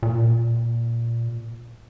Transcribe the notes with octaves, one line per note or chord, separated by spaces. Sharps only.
A#2